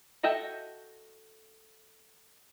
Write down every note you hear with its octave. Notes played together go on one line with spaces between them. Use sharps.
F#4 A4 D#5 E5 G5